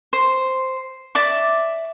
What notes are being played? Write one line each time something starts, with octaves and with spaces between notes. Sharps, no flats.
C5
D5 E5 D6